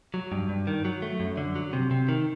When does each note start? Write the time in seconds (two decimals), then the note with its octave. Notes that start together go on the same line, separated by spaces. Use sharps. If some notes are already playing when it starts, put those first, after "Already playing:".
0.14 F#3
0.32 G2
0.49 G2
0.67 D#3
0.85 F#3
1.02 A3
1.20 F#2
1.37 D3
1.55 F#3
1.73 C3
1.91 C3
2.09 D#3